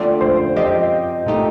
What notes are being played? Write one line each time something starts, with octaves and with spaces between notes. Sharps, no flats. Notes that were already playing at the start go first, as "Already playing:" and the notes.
Already playing: D3 F3 A3 C4 F4 D5
C5
F3 C4 G4 D#5
A#2 A3 D#4 G4